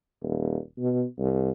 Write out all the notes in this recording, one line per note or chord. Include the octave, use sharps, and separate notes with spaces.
D#1
B2
C2